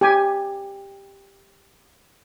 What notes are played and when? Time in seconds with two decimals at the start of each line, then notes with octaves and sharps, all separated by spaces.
0.01 G4 G#5